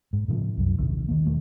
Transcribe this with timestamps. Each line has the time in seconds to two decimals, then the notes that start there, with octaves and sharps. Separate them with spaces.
0.13 G#2
0.28 A2 C#3 F3
0.57 C2 F#2
0.78 A#1 D#2 C3 D#3
1.08 D#3 A#3
1.25 E1 D#2 A3